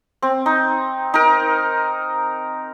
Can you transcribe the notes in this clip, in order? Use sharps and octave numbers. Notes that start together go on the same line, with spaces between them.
C4
D#4
D#4 A#4